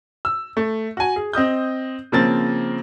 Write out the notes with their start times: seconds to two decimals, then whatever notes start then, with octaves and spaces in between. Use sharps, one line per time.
0.25 E6
0.57 A3
0.97 F#4 G#5
1.16 G#4
1.33 C4 D#5 D#6 G6
2.12 C#3 F3 A#3 C4 A6